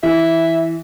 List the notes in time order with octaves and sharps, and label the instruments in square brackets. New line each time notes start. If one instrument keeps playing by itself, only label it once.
[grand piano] E3 [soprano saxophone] E5